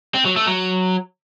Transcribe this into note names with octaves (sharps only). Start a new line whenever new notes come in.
C4
F#3
A3
F#3